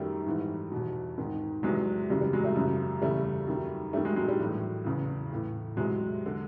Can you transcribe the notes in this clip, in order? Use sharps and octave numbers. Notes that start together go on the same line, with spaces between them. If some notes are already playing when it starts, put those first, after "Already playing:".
Already playing: F#2 D#3 G3 A3
G#2 E3
E2 B2
G#2 D#3
E2 C3 E3 F#3 G#3
F#2 C#3 E3 G3
G3
F#3 G#3
G3 A3
F#2 C#3 E3
E2 C#3 E3 G3 A3
F#2 D#3
G2 D#3 G3 A3
F#3 G#3
F#3 G#3
G3
A2 E3 F#3
E2 C#3 E3
A2 E3
E2 C3 E3 F#3 G#3
D3